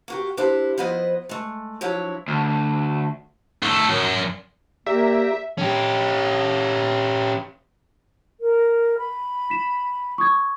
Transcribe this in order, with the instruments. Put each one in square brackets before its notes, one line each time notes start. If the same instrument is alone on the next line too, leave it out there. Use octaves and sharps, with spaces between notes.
[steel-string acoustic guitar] A#3 F#4 G4
D4 E4 G4 B4 C5
F3 B3 E4 B4 C5 D#5
G#3 A3
F3 F#3 D4 E4 C#5
[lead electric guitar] D2
[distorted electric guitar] B1 A3
F#2
[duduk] A#3 [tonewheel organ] G4 D5 A#5 [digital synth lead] E5
[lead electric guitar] C#4 G4
[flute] A#4
B5
[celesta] B6 E7
C#6 D#6 G#6